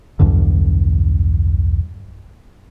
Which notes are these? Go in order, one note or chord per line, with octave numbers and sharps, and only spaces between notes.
B1 E2 G2 D3